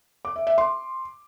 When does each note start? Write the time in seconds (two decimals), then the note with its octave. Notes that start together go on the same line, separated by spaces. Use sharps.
0.25 D6
0.36 E5
0.47 E5
0.58 C6